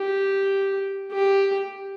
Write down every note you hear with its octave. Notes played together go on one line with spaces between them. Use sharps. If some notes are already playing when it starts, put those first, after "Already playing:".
Already playing: G4
G4